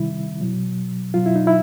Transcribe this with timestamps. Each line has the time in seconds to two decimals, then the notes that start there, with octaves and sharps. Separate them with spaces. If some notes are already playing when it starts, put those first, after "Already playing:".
Already playing: C3 D#3 G3 E4
0.41 B2 F#3
1.14 B2 F#3 F4
1.26 E4
1.36 D#4
1.47 E4